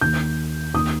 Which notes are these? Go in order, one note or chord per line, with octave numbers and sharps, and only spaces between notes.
D#2 D#3 G6
D#2 D#3 D#6